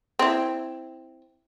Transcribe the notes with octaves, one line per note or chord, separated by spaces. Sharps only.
C4 E4